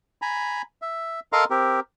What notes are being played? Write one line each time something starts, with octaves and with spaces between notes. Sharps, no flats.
G#5 A#5 B5
E5
A4 A#4 D#5 F5 A#5 C6
C4 G4 A#4